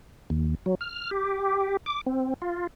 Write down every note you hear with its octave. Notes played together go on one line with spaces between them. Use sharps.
D#2
F#3
F6
G4
D6
C4
F4